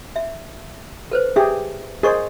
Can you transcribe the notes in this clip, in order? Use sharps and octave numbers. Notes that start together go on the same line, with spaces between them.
E5
A4 B4 C5
G4 G#4 E5
G#4 A#4 C5 D#5 C#6